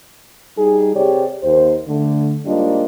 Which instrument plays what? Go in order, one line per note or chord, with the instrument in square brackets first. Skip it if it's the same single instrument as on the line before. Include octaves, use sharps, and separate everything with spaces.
[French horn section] G3 D#4 G#4
C3 G4 G#4 C#5 D5
D#2 C5
D3 A3
G#2 G3 A#3 D4 F4 D#5